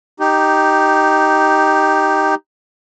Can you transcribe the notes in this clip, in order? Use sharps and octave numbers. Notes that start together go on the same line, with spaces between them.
D#4 G4